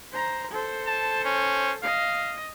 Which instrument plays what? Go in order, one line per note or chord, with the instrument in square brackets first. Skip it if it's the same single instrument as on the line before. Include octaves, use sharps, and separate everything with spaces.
[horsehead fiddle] C5 A#5
A4 C5
[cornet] A5
C#4
[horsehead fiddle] D#5 [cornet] F5